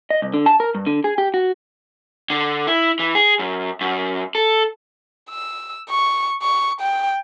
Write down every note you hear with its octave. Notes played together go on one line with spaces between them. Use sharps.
D#5
C2
D3
A5
A#4
G2
D3
G#4
G4
F#4
D3
E4
E3
G#4
F#2
F#2
A4
E6
C#6
C#6
G5